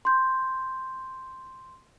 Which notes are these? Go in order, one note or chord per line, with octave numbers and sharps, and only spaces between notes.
C6 G6